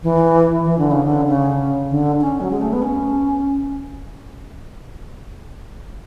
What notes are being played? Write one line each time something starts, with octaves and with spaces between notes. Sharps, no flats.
E3
E3
D3
C#3
D3
C#3
D3
C#4
F#3
G#3
A3
B3
C#4